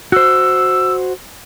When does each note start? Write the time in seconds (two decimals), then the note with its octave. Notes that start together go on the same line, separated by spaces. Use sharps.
0.12 F#4 C5 E6